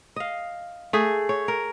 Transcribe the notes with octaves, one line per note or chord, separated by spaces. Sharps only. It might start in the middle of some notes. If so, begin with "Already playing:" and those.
D#5 F5
A3 G#4
C#5
A#4